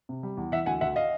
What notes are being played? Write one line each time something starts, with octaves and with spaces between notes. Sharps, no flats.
C3
G3
E2
E3 E5 F#5
D2 F#5 G#5
D2 E5 F#5
D#5 F5